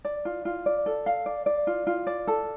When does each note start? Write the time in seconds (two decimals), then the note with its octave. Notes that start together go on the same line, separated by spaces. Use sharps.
0.05 D5
0.25 F4
0.45 F4
0.66 D5
0.86 A4
1.06 F5
1.26 D5
1.46 D5
1.67 F4
1.87 F4
2.07 D5
2.27 A4